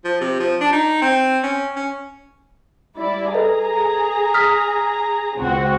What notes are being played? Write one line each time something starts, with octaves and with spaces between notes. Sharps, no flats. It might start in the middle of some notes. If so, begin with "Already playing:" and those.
F3
C3
F3
D4
D#4
C4
C#4
C#4
G3 E4 D5
G#4 A4 B4 D#5 A#5
D#6 F6 B6
C#2 C4 F#4